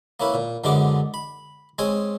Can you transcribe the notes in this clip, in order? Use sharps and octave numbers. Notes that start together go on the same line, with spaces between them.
A#3 C#4 E4 B4
A#2
F#2 D3 G#3 B3 D4 D6
B5
G#3 C4 C#4 G#5 D#6